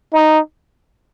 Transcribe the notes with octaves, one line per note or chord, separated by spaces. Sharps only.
D#4